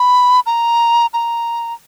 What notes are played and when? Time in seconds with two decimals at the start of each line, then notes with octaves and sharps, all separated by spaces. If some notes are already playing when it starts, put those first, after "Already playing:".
Already playing: B5
0.46 A#5
1.13 A#5